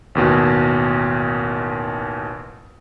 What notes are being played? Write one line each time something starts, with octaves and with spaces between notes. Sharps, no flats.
A1 D#2 B2